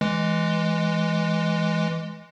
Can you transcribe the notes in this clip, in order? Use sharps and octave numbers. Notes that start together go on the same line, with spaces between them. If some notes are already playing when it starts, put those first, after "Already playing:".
E3 G#3